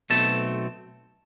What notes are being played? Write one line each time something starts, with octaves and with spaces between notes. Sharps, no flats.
B1 B2 A3 C4 A5